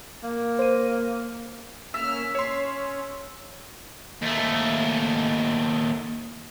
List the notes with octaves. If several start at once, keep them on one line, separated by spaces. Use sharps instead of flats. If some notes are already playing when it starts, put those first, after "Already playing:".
A#3
C5 D#7
A#3 C#4 E5 F6
C#4 C#5 C6
D#2 A3